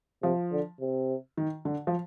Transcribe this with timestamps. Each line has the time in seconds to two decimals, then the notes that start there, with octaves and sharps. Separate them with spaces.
0.23 C3 F3
0.52 D3
0.81 C3
1.37 D#3
1.65 D3
1.87 F3